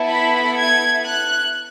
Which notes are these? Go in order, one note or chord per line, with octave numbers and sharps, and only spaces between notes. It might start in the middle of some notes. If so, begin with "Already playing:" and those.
Already playing: B3 E4 A4
B5
G#6
F#6